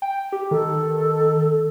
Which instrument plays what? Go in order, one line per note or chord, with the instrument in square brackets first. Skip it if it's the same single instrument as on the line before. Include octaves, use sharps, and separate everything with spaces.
[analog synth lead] G5
G4
[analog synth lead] D#3 [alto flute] A4